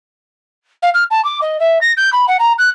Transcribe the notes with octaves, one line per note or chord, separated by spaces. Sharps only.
F5
F6
A5
D6
D#5
E5
A#6
G6
B5
F#5
A#5
F#6